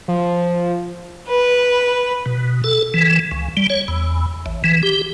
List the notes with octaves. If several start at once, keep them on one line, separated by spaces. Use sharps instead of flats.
F3
B4
B2
A4
E3
C#2
G3
C#5
E2
A1
E3
G4